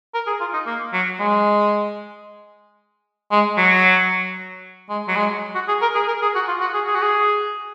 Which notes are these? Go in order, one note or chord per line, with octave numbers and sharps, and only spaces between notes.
A#4
G#4
F4
D#4
A#3
F#3
G#3
G#3
F#3
G#3
F#3
G#3
F#4
G#4
A#4
G#4
A#4
G#4
F#4
F4
F#4
G#4
G#4
F#4
G#4